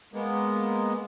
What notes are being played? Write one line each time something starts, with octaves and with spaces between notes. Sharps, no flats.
G#3 A#3 B3